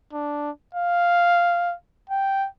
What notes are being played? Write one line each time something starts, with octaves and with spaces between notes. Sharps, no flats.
D4
F5
G5